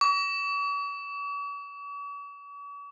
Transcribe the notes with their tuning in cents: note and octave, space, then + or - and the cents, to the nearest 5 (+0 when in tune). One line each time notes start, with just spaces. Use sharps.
C#6 +45